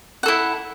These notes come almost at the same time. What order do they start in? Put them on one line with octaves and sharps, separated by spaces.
F#5 A4 E4